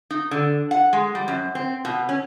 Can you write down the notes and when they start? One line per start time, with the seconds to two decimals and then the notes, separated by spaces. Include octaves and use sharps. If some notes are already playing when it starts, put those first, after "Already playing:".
0.10 D#4
0.31 D3
0.71 F#5
0.93 G#3
1.15 G3
1.28 F#2
1.55 C4
1.85 B2
2.09 C#4